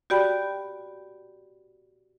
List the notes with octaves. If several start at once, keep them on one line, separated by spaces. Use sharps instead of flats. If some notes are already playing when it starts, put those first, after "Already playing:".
F#4 G4 D5 G5 B5